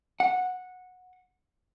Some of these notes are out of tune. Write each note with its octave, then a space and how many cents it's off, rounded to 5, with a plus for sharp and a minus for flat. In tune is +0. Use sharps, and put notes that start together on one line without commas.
F#5 -15